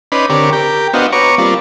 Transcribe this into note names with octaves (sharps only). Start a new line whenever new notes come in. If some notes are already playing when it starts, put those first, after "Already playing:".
C#4 D#4 B4 D5 B5 C6
D3 C4 G4 A#4 C#5 D5
G4 A#4 G5
B3 D4 F#4 C5 D#5 F5
B4 C#5 A#5 C#6 D6
G3 A#3 C4 F4 D5